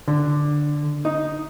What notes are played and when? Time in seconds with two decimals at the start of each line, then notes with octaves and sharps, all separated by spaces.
0.08 D3
1.05 D#4